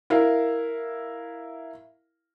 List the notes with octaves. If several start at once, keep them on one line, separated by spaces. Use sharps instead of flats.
E4 A#4 F5